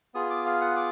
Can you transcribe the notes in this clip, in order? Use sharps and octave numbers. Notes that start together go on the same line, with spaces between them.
B3 F4 G#4 D#6
D6
F5
F#5
D6